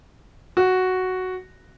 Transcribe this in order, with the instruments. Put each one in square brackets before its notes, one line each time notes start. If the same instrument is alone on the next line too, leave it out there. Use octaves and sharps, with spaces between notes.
[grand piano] F#4